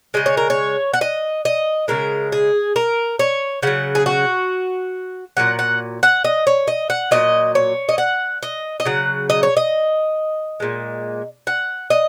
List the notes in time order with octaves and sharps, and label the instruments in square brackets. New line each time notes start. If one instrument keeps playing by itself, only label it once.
[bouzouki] C#3 G#3 D#5
C#5
A#4
C#5
F#5
D#5
D#5
C#3 G#3 A#4
G#4
A#4
C#5
C#3 F#3 F#5
G#4
F#4
A#2 F#3 F#5
F#5
F#5
D#5
C#5
D#5
F#5
A#2 F#3 D#5
C#5
D#5
F#5
D#5
D#5
C#3 F#3 F#5
D#5
C#5
D#5
A#2 G#3
F#5
D#5